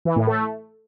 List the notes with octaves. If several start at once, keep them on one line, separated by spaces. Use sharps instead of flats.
E3
A2
A3